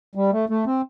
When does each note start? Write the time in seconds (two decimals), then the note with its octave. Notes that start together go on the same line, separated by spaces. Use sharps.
0.15 G3
0.32 A3
0.49 A3
0.66 C4